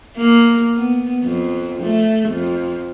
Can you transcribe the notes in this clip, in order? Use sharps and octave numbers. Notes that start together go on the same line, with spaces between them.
A#3
B3
F2
A3
F2